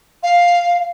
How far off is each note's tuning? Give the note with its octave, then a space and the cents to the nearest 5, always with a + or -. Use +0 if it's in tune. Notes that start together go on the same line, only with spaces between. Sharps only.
F5 +5